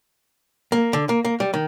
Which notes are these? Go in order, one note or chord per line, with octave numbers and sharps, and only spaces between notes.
A#3
D3
A#3
A#3
G3
D#3